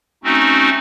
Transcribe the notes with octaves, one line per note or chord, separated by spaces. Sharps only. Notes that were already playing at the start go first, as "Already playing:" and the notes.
A3 C4 C#4 D#4 F#4